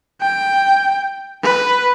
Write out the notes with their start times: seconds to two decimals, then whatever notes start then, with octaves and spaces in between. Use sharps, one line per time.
0.22 G5
1.44 B4